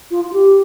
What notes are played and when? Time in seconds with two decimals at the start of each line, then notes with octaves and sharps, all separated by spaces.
0.11 F4
0.24 F4
0.33 G4